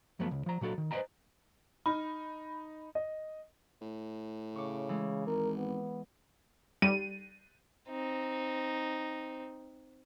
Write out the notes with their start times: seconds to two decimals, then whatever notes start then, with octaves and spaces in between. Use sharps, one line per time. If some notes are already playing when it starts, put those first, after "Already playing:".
0.19 F#2 F3 F#3 A3 B3
0.31 C#2
0.46 F3 A#5
0.61 A#2 F#3 F#4 A4
0.78 D#3
0.91 B4 C5 D5 D#5 G#5 A#5
1.86 D#4 B5
2.95 D#5
3.82 A2
4.56 C#3 C#6 D6
4.89 E3 G#3
5.27 G#1 A#4
5.57 B3
6.82 G3 D#7
7.89 C4 D#4